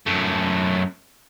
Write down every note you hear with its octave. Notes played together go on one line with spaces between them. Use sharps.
F#2 A3